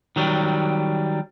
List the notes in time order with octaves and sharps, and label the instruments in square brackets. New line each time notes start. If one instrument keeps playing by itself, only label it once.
[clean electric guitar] D#3 F#3 G3